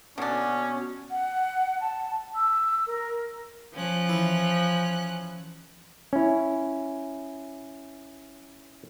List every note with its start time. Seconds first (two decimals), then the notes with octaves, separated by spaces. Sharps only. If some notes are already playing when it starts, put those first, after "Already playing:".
0.18 B2 D3 C#4 D4
1.10 F#5
1.80 A5
2.35 E6
2.86 A#4
3.74 F3 C#4 F#6
4.09 E3
6.13 C#4 E4